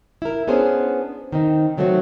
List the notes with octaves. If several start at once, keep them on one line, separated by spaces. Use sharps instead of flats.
E4 A#4
B3 C#4 D4 G#4 C5
D#3 C4 D#4
D#3 F#3 A3 C4 F#4